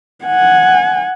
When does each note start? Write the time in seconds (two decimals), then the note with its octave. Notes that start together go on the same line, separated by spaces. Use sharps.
0.25 F#5 G#5